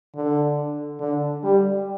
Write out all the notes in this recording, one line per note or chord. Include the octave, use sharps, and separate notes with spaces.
D3
D3
G3